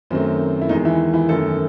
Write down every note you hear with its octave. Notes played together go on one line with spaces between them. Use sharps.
F#2 D#3 F#3 A3 C4
E4
E2 D#3 G#3 D#4
E3 E4
E3 E4
F#2 D#3 A3 A4